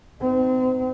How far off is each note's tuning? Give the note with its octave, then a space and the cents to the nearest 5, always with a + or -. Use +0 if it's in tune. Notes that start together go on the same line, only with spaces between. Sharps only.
C4 -35 D#4 -5